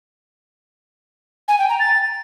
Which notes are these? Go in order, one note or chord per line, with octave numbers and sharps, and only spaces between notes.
G#5
G5
A#5
A6